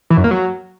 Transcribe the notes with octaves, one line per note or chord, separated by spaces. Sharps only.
E3
F#2
A#3
F#3